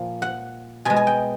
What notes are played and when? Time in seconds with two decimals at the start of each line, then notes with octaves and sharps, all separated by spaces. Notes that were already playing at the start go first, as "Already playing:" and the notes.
Already playing: A#2 F3
0.22 F#5
0.85 B2 G#3 G#5
0.96 G#5
1.07 G5